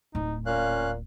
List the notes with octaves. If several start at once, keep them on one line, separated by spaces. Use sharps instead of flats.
D1 D#4
A#2 C#4 F5 F#6